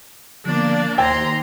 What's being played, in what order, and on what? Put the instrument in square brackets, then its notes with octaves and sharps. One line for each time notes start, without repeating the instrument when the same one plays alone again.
[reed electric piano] D3 F3 B3 [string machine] A#3 [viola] D4 D5
[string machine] D#2 [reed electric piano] C5 E6 G#6 [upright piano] G5 [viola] A#5 C6